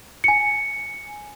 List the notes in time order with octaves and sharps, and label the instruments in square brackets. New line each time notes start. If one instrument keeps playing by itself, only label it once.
[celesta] G#5 C#7